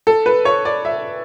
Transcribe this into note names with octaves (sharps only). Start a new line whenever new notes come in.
A4
B4
C#5
D5
E5